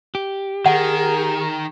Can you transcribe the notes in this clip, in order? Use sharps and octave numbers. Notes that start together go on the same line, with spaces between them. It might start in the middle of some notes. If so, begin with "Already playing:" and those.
G4
D#3 G#4 A#4 F#5